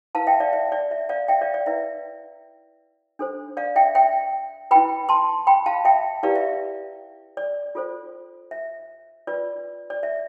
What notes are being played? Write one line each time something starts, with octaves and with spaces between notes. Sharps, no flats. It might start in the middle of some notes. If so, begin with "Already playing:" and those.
E4 B4 F5 A5
E5 G5
D5 F5
E5
D5
E5
D5 F5
E5 G5
D5 F5
D5
E4 B4 E5
D4 A4 C5
D5 F5
E5 G5
E5 G5
E4 B4 G5 B5
A5 C6
G5 B5
F5 A5
E5 G5
E4 G4 B4 D5 F5
E5
D5
F4 A4 C5
E5
F4 B4 D5
D5
E5